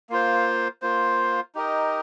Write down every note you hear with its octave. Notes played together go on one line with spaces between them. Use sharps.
A#3 F4 C5
A#3 F4 C5
D#4 G4 A#4 D#5